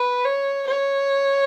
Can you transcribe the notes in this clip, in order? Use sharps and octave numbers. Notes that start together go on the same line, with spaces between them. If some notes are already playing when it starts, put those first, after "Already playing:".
Already playing: B4
C#5
C#5